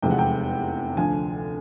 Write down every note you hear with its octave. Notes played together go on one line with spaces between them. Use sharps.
F1 E2 C3 F3 G#3 G5
F#5
G5
D2 D3 F3 G#5